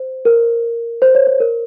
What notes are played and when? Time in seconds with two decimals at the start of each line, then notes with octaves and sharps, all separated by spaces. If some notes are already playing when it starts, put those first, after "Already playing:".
Already playing: C5
0.25 A#4
1.02 C5
1.15 C#5
1.27 C#5
1.40 A#4